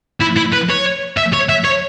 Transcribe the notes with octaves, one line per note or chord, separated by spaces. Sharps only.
E4
E4
B4
C#5
E5
C#5
E5
C#5